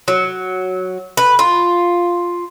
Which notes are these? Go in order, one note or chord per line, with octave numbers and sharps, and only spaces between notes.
F#3
B4
F4